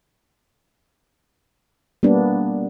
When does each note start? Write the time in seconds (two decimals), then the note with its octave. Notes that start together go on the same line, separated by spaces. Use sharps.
2.03 G3 A#3 B3 D4